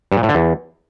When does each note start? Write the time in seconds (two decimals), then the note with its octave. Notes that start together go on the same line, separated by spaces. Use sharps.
0.12 G2
0.17 A#2
0.23 A2
0.29 D3
0.35 E2